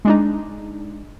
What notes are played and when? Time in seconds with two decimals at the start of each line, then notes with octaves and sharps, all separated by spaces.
0.05 G#3 D4 D#4